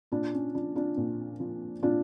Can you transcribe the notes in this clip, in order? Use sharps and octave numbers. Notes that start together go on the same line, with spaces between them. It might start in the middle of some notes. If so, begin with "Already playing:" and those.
A#2 D4 F4
C#4
F3 D4
D4 F4
A#2
F3
A#2 D4 F4